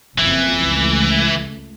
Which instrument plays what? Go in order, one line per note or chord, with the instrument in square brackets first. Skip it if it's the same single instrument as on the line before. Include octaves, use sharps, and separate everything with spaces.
[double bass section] F#1 F2 [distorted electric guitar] E3
[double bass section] C#2 A3